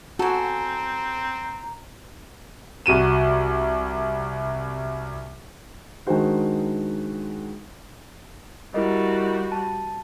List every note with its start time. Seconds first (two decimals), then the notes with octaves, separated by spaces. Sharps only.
0.19 C4 F#4 A4 G#5 A#5
2.86 C2 F#4 D#7 E7
6.07 D#3 G#3 D4 D#4 F#4 C5
8.74 G3 E4 F#4 A#4 D#5
9.52 A5